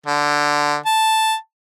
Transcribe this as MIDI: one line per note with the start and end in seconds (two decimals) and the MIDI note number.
0.06 0.76 50
0.86 1.35 81